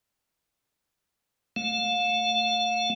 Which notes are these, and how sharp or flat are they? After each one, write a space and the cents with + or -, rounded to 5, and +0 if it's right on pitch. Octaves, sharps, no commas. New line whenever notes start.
A3 +0 F5 +35